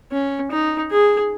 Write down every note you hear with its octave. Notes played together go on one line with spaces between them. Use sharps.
C#4
D#4
G#4